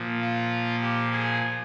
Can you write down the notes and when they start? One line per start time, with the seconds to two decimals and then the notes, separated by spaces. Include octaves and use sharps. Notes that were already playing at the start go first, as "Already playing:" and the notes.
Already playing: A#2 F3
0.21 F4
0.81 G4
1.12 G#4